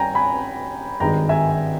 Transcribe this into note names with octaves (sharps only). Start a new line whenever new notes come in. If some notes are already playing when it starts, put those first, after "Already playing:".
Already playing: G2 G3 C#4 G5 G#5 A#5
G#5 B5
G#1 G2 D#3 G#3 D#4 G5 A#5
E5 G#5